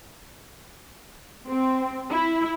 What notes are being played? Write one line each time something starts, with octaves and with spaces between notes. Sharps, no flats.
C4
E4